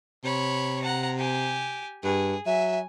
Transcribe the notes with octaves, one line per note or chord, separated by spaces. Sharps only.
C3 C#5 B5
F#5 A#5
G4 G#5
G2 G#4
F#3 E5 G#5